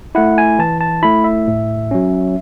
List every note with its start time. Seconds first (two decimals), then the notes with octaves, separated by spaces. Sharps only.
0.15 A3 E4 F#5
0.38 G#5
0.59 E3 A5
0.81 A5
1.02 A3 E4 B5
1.24 E5
1.47 A2
1.91 F#3 C#4